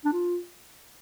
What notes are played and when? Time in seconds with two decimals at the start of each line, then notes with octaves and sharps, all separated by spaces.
0.05 D4
0.13 F4